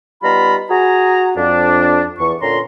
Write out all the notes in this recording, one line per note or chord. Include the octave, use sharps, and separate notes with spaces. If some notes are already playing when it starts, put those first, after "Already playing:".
G3 B3 D#4 F4 A#5 B5
F#4 G#4 A#5
F2 D4
E2 C#6
A#2 D3 C#4 A#5 C6